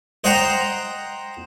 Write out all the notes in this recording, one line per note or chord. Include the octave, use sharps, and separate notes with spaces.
C5 D#5 F#5 G5 A#5 C6